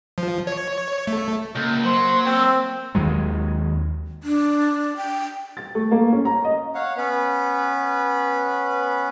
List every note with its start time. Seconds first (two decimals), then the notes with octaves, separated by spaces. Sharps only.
0.18 F3
0.47 C#5
1.07 A3
1.55 C#2 A#3 G6
1.84 F#3 C5
2.26 C4 E6
2.95 D#2 D#3 F#3 G#3
4.23 D4
4.97 G5
5.57 A6
5.75 A3
5.91 A#3
6.12 C#4
6.25 A#5
6.44 D#5
6.75 C#5 F5 F#5
6.97 B3 C#4 B4